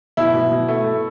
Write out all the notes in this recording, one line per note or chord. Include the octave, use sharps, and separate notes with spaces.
B2 E4
B2
B2
A3
A3